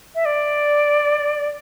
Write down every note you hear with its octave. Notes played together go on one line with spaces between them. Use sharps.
E5
D5